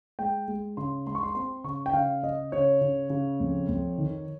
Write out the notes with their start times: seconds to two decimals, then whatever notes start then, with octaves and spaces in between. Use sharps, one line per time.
0.19 G#3 G5
0.48 G#3
0.77 C#3 C6
1.06 G#3 C6
1.15 C#6
1.23 C6
1.35 C4 C6
1.64 C#3 C#6
1.86 G5
1.93 C#3 F5
2.24 C#3 D#5
2.52 C#3 C#5
2.81 C#3
3.10 C#3
3.40 F2
3.68 F2
3.98 D#3